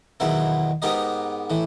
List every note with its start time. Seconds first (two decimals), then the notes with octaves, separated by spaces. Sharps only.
0.20 E2 B2 D#3 F#3 E4
0.82 G#2 B3 G4 A#4 D#5
1.50 A2 E3